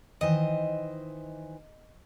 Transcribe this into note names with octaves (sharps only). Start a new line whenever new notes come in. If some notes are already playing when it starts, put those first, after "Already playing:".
D#3 E3 C5 D#5